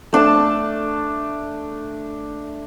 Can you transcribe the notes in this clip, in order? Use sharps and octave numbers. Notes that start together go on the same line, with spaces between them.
A3 D4 A5 E6